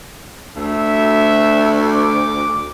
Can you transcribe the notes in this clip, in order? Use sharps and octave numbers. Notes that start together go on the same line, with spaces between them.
D2 E5
D6